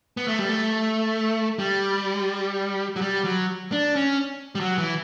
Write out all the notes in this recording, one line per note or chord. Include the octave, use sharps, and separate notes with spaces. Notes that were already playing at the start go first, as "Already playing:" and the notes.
B3
A3
G3
A3
G3
F#3
G3
F#3
D4
C#4
G3
F#3
E3